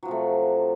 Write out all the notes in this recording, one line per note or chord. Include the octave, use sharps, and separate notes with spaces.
C3 F3 F#3 A3